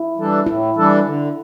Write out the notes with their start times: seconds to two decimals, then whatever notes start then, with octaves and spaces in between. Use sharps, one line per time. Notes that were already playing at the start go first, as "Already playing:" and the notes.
Already playing: E4
0.17 E3 G3 D4 A4
0.46 A2 E4
0.76 E3 G3 D4 A4
1.05 D3